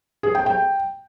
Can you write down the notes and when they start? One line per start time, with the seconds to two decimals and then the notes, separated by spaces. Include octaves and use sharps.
0.23 G#4
0.35 G5
0.46 G5